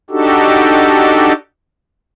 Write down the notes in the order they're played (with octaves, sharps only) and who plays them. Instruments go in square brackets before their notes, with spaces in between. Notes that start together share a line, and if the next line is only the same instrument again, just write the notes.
[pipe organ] D4 D#4 F#4 G4 A4